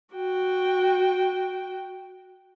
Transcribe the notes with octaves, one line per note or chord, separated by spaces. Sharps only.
F#4 G5